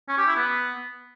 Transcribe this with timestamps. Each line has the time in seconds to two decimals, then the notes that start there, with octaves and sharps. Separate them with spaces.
0.08 C#4
0.18 G4
0.27 E4
0.36 B3